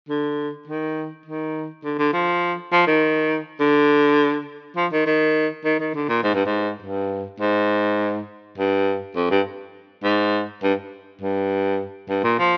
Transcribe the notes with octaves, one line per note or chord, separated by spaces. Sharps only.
D3
D#3
D#3
D3
D3
F3
F3
D#3
D3
F3
D#3
D#3
D#3
D#3
D3
A#2
G#2
G2
G#2
G2
G#2
G2
F2
G2
G#2
G2
G2
G2
A#2
F3